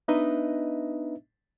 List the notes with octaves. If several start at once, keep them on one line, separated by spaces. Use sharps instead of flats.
B3 D4 D#4 B4 D#5 E5